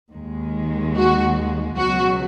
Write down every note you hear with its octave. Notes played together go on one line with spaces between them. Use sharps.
D#2 D#3 G#3
F#4
C#2 B2 F#3 F#4